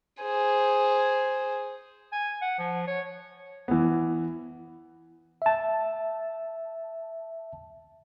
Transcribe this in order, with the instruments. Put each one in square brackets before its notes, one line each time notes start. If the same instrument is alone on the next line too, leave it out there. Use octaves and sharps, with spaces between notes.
[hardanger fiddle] G#4 C5
[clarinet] G#5
F#5
F3
C#5
[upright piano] E3 B3
[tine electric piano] E5 A5